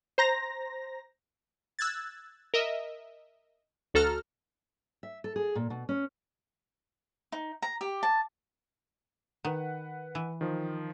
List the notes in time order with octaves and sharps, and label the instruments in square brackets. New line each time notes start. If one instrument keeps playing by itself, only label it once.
[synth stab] C5 A#5 A#6
E6 F#6 G#6 A6
A#4 D#5 E5
D2 F#4 A4 A#5 F6
[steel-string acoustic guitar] E5
A4
G#4
A#2
B2
C#4
[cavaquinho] D#4
A#5
G4
A5
[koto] D#3 [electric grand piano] B4 F#5
[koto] E3
[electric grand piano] D#3 F3